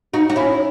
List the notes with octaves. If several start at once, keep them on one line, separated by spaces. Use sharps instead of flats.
D#4 F#4
F#4
C#4 E4